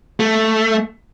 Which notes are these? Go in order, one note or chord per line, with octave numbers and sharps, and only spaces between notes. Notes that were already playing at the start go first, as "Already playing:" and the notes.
A3